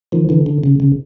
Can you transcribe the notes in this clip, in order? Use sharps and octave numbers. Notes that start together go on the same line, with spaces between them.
D#3 F3
D3 E3
D3
C#3
C#3